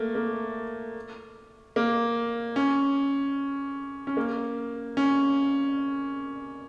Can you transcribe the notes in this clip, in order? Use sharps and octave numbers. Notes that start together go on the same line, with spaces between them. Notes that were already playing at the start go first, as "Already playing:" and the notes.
Already playing: A3 A#3
A#3
A#3
C#4
C#4
A#3
C#4